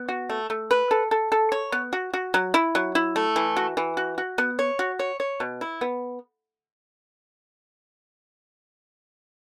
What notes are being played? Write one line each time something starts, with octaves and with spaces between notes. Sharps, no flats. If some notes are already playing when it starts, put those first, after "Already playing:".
Already playing: B3
F#4
A3
A3
B4
A4
A4
A4
C#5
B3
F#4
F#4
F#3
E4
F#3
E4
A3
E3
F#4
E3
F#4
F#4
B3
C#5
F#4
C#5
C#5
B2
E4
B3